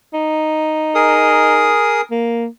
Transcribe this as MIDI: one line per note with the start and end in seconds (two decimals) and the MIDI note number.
0.14 1.77 63
0.95 2.01 68
0.95 2.01 70
0.95 2.01 87
2.11 2.47 58